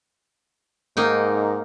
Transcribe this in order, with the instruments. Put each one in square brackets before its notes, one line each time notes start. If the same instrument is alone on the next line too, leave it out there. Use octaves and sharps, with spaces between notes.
[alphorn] G#2 [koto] A#3 D#4 G5